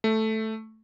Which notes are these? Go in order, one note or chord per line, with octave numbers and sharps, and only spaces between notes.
A3